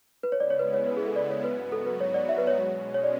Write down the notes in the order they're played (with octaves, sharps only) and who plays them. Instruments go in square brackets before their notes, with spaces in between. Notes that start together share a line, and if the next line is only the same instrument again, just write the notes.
[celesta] B4
[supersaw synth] C#3 G#3 B3 E4 [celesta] C#5
[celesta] D5
C#5
B4
C#5
B4
G#4
A4
D5
C#5
[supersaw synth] G#2 F#3 B3 F#4 [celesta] B4
[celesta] A4
B4
C#5
D5
E5
B4
C#5
[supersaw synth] B2 G#3 C#4
[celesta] C#5
D5